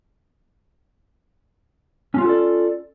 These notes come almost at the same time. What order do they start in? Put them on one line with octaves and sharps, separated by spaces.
C#4 F4 F#4 A4 D5